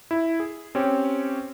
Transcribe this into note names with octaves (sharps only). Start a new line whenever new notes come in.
E4
G#4
C4 C#4 G4 C#5